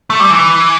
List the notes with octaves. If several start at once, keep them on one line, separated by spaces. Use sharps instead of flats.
A3
G3
E3